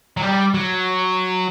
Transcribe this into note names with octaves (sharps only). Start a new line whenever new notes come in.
F#3
G3
F#3